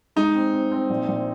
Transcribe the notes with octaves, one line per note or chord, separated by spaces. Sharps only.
G#3 D#4
C4
C4
C4
A#1
A#1